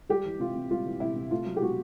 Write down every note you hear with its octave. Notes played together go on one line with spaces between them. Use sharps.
G3 G4
E3
C3 F4
C3
G3 F4
E3
C3 E4
C3
A3 F4
F#3
G4
B2 F#4